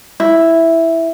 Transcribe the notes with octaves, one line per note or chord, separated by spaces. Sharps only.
E4